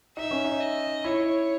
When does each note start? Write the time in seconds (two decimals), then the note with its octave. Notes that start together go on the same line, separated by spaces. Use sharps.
0.17 D#4 E5
0.31 C#4
0.44 D#4
0.61 D#5
1.04 E4 C#5